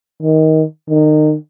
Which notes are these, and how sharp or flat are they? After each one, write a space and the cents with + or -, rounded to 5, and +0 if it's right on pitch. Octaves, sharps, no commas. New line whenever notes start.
D#3 +20
D#3 -25